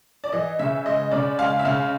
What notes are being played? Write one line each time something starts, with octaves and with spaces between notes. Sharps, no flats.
D5
E3 D#5
C#3 E5
G#3 D#5
C#3 D5
G#3 F5
E5
C#3 F5